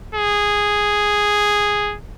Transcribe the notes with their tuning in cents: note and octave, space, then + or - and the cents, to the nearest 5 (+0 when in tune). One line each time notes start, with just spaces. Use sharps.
G#4 -5